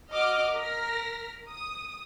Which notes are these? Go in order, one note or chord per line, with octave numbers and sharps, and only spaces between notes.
F#4 D#5 D6 F6
A#4 F6 A#6 B6
D#6